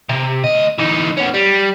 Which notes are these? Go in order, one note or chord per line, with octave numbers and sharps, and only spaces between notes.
C3
D2 D#5
E3 D#4
B3 C#4
G3